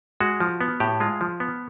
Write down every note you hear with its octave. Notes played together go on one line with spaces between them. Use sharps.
G#3 F#4
F3
B3
A2 G4
G#3 F4
F3
B3